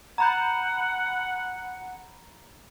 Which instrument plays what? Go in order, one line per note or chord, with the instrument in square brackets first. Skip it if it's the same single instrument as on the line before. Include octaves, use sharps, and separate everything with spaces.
[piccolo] F#5 [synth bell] A#5 B5 G6